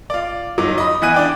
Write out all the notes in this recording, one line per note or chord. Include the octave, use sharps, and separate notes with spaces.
F4 D5
G1 F#3 D#4 D6
D#5 B5 D#6
E3 B3 D#5 G#5 F#6 D#7
D4 D5 G5